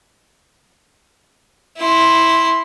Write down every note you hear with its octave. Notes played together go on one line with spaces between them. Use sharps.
E4 C6